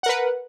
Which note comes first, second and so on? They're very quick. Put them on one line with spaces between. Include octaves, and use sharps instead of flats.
F#5 A#4 B4